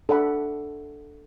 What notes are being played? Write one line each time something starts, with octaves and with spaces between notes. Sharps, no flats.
D4 A4 D5 F#5 B5